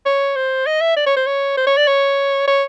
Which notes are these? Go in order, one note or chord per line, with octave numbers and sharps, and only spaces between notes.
C#5
C5
D#5
E5
D5
C#5
C5
C#5
C5
C#5
D5
C#5
C#5